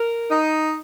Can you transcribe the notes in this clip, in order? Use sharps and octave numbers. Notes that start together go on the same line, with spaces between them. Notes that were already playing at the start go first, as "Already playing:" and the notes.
Already playing: A#4
D#4